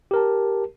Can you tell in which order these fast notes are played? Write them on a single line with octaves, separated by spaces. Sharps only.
G4 A#4 A5